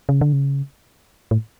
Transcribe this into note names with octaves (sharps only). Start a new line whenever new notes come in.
C#3
D3
C#3
A2